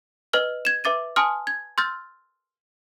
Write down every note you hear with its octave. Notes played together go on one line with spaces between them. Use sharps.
B4 D#5 F6 G7
G#6 E7
B4 E5 D6 A6 D#7
G#5 A5 C6 D#6 F6
G#6
C6 E6 F6 G6 A6